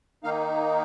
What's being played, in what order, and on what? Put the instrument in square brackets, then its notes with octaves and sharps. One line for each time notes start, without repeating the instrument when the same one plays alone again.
[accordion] D#3 A#3 D#4 F5